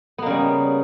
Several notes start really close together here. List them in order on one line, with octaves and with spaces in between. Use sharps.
B3 A#3 C#3 G3